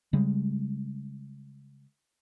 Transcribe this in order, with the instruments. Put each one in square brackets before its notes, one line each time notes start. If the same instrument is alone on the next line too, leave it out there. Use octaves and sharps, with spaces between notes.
[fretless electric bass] C#3 G3 G#3